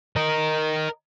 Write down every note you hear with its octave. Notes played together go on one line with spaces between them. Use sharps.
A#4 D#5